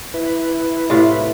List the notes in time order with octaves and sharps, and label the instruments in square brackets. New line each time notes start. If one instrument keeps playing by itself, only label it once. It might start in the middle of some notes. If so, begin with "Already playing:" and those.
[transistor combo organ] E4 B4
[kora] A2 C3 F4